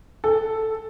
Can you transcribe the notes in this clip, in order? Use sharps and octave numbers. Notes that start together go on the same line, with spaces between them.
A4